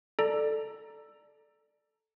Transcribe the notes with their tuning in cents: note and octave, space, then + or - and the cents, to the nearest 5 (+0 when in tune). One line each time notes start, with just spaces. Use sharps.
A4 +0 D5 +15 A#5 +0